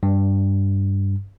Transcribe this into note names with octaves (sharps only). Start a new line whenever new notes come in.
G2